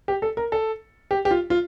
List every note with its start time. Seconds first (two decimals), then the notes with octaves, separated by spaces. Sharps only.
0.08 G4
0.22 A4
0.37 A#4
0.52 A4
1.11 G4
1.25 G4
1.31 F4
1.50 F4